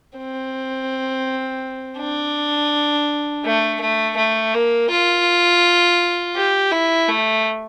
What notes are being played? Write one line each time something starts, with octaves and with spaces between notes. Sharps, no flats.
C4
D4
A3
A3
A3
A#3
F4
G4
E4
A3